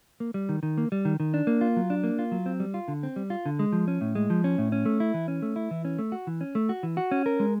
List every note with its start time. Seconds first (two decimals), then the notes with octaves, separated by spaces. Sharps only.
0.20 A#3
0.34 G3
0.49 D#3
0.63 D#3
0.78 A#3
0.92 G3
1.05 D#3
1.20 D#3
1.34 D4
1.47 A#3
1.61 F4
1.76 F#3
1.90 D4
2.04 A#3
2.19 F4
2.32 F#3
2.46 C4
2.60 G3
2.74 F4
2.88 D3
3.03 C4
3.16 G3
3.30 F4
3.46 D3
3.59 G#3
3.73 F3
3.88 C#4
4.01 A2
4.15 G#3
4.30 F3
4.44 C#4
4.58 A2
4.72 C#4
4.86 A3
5.00 E4
5.14 E3
5.28 C#4
5.42 A3
5.56 E4
5.71 E3
5.85 C#4
5.99 A3
6.12 F#4
6.27 E3
6.41 C#4
6.55 A3
6.69 F#4
6.83 E3
6.97 F#4
7.11 C#4
7.26 A#4
7.40 G#3